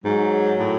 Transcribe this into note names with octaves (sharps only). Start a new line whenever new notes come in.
G#2 F#3
A2